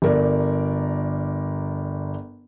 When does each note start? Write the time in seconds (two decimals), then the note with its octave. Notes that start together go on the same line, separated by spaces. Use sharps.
0.02 G1 A#4 D5